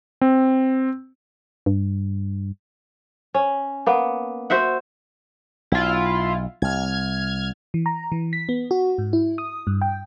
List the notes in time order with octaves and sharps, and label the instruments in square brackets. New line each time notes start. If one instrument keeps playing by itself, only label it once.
[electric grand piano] C4
[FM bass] G2
[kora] C#4
A#3 B3
F#4 C5 E5 F#5
[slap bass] B1 [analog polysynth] E4 F4
[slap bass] C2 [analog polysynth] F6 G#6
[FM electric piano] E3
A#5
E3
B6
B3
F#4
G#2
E4
D#6
G2
G5